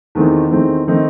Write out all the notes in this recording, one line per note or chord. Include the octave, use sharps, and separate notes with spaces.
E2 D#3 A3 C4 D#4
E2 D#3 A3 C4 D#4
D#3 A3 C4 D#4